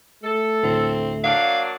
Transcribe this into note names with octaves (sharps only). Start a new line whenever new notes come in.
A3 A4
D2 A2 C4
F#3 A#3 D4 F5